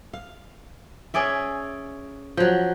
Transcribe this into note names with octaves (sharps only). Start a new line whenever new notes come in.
F5
C#4 G#4 D5 E5
F3 F#3